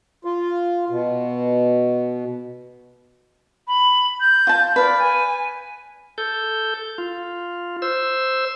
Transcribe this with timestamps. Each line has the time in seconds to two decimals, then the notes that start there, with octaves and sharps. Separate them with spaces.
0.25 F4
0.90 B2
3.68 B5
4.20 G6
4.47 F4 A5
4.76 B4 D5 F5
4.98 G#5
6.18 A4 G6
6.98 F4
7.82 C5 E6